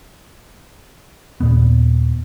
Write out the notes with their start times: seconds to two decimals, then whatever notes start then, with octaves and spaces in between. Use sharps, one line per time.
1.40 D#2 A#2 B3